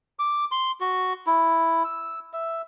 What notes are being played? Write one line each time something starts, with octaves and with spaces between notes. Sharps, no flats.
D6
C6
F#4
E4
E6
E5